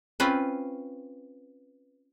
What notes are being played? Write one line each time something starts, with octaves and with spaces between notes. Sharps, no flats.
C4 C#4 F4 B4